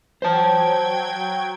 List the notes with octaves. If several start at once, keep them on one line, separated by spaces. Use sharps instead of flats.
F#3 C5 G5 A5 G#6